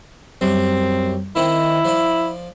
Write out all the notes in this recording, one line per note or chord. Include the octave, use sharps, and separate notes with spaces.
F#2 G3 C4
D#3 C4 E4
F3 D5